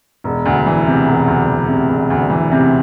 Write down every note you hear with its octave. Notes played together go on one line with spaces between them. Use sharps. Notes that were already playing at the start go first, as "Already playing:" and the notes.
E1
D2
E3
C3
E1
D2
E3
C3
E1
D2
E3
C3